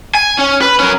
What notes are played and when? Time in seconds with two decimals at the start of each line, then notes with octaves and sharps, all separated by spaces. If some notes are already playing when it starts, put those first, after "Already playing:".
0.15 G#5
0.39 C#4
0.62 B4
0.80 C#4 A#4